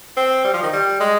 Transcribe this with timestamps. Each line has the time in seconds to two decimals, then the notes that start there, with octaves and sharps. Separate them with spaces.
0.17 C4
0.44 G3
0.54 F3
0.63 D#3
0.73 G3
1.00 G#3